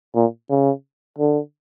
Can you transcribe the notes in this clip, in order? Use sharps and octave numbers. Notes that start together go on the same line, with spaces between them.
A#2
C#3
D3